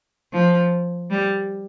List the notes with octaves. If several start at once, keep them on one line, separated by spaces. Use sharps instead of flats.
F3
G3